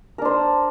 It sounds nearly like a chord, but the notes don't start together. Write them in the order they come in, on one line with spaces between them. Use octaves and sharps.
A#4 D4 C5